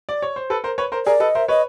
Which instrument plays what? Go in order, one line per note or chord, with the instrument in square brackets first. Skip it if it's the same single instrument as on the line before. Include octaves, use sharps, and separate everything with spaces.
[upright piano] D5
C#5
C5
A4 B4
A#4 C5
B4 C#5
A#4 C5
[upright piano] G#4 A#4 [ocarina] D5
[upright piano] A4 B4 [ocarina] D#5
[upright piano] A#4 C5 [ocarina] E5
[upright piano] B4 C#5 [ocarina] D#5